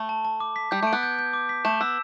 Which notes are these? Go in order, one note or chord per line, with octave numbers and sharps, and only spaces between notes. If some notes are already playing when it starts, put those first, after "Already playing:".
Already playing: A3
A5
A5
D6
B6
G3 G6
A3 D7
B3
G6
G6
D6
B6
A3 E7
B3 E6